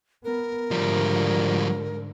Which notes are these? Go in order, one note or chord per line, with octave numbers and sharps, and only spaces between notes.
B3 A#4
G#2 D3 F3 G3